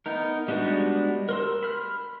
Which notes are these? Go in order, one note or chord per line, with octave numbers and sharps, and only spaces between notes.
B3 D#4 A#4
G3 G#3 B3 D4 F#4
A#4 C6 E6
B5 F6